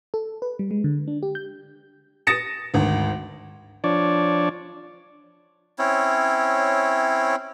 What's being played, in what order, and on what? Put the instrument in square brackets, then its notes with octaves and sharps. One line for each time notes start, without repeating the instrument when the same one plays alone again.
[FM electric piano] A4
B4
G3
G#3
D3
D4
G4
G6
[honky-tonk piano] D#6 A6 A#6 C#7 E7
G#1 D2
[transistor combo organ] F3 D4 C#5 D5
[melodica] C4 C#4 E4 C#5